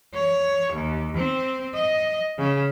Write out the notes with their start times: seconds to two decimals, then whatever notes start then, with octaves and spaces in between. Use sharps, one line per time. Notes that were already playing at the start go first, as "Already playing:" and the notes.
0.15 C#5
0.73 D#2
1.17 C4
1.75 D#5
2.38 C#3